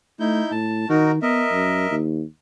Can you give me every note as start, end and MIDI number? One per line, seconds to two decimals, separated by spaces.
0.20 0.42 57
0.20 0.51 63
0.20 0.51 64
0.20 0.51 91
0.51 0.89 45
0.51 0.88 81
0.89 1.21 51
0.89 1.11 63
0.89 1.11 66
0.89 1.11 70
1.22 1.45 59
1.22 1.95 70
1.22 1.95 75
1.22 1.95 76
1.51 1.89 42
1.91 2.23 39